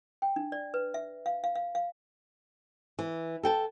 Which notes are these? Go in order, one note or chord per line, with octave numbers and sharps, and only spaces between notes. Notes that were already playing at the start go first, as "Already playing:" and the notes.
G5
D4
D5
B4
E5
F5
F5
F5
F5
E3
A4 G5 A5